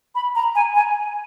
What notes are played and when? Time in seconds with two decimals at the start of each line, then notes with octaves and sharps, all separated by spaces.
0.15 B5
0.35 A#5
0.55 G#5
0.75 G#5